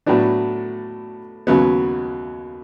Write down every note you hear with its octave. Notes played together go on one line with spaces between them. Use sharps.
A2 F#3 B3 D4
D#2 C#3 F#3 B3